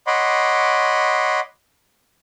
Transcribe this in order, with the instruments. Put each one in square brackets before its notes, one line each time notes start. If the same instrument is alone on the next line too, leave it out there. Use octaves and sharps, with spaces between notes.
[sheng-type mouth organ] C#5 D#5 F#5 B5 C6 D6